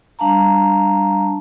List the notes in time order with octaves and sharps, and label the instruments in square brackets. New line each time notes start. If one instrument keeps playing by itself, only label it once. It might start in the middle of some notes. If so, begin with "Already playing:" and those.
[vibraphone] G3 D4 F5 A5 A#5